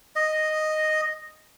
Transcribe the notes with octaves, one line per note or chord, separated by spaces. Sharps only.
D#5